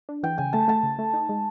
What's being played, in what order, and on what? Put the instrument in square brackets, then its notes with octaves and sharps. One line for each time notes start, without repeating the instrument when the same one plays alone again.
[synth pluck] D4
[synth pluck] E3 [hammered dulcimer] G5
[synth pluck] C#3 [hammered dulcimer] G#5
[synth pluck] A3 [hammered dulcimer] A5
[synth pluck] A3 [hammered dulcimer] A5
[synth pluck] C#3
A3
D#4
G#3